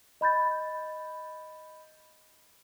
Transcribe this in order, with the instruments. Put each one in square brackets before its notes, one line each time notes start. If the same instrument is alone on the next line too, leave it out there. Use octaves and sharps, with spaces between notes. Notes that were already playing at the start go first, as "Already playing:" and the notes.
[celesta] D#5 B5 G6 A6